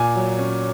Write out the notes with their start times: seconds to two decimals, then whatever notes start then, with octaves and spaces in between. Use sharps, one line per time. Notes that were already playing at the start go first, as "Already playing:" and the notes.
Already playing: A#2 G#5
0.15 F#3
0.39 C#4